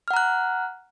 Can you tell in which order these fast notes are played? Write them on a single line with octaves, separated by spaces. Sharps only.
F6 F#5 A#5 F#6